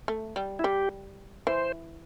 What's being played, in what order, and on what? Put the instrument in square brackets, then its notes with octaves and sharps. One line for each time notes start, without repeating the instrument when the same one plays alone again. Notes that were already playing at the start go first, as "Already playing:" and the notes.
[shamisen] A3
G3
[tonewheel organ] E4
[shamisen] G3 [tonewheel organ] G4
[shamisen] E3 [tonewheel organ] C5